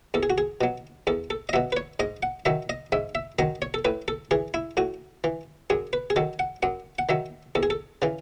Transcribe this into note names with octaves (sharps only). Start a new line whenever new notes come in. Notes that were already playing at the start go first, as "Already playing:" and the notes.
E2 A4
G#4
F#4
G#4
B2 F#3
E2 A4
A4
D#5
B2 F#3 E5
B4
C#5
G#2 D#5
F#5
D#3 F#3 E5
D#5
G#2 E5
E5
D#3 F#3 D#5
C#5
A4
A2 B4
A4
E3 G#4
E4
A2 F#4
E3
F#2 G#4
B4
G#4
D#3 F#3 A4
F#5
F#2 F#5
F#5
D#3 F#3 E5
E2 A4
G#4
A4
C#3 E3